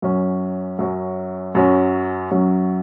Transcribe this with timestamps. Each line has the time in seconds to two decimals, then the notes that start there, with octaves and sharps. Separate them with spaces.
0.02 F#2 F#3 C#4
0.79 F#2 F#3 C#4
1.55 F#2 F#3 C#4
2.31 F#2 F#3 C#4